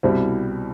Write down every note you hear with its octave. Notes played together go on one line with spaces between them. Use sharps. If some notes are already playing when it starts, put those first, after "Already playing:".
C2 B2 G3 C4 E4